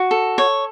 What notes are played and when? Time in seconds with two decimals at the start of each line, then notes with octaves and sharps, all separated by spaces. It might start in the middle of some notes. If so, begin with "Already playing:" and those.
Already playing: F#4
0.11 A4
0.38 C#5